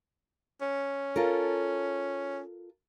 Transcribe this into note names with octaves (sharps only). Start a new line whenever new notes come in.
C#4
F4 A4 A#4